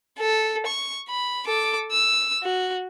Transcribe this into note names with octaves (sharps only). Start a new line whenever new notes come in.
A4
C#6
B5
A4 D6
E6
F#4